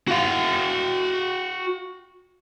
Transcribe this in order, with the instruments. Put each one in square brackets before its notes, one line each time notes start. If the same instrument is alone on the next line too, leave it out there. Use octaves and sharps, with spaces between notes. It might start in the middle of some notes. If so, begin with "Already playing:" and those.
[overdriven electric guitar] F#4 F5